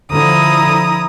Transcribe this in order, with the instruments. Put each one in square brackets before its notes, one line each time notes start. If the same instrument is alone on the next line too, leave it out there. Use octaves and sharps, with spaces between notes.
[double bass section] D3 F3 [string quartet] E4 A#5 D#6